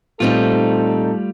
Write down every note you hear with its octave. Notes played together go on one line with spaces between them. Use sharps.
A#2 G3 A3 C4 D#4 F4 A4